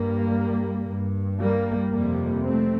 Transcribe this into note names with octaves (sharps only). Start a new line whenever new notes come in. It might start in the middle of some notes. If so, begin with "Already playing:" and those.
Already playing: G2 G3 A#3
G2
G3 A#3
F2 C3 G3 A#3
A3 C4